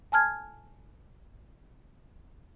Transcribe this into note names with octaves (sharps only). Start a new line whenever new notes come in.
G#5 A5 F6 G#6